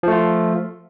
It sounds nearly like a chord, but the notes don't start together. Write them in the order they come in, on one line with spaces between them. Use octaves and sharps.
F3 A3 F4